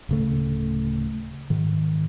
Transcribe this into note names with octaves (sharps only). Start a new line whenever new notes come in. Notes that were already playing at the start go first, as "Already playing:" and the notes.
D1 C#3 A3
G#2 D#3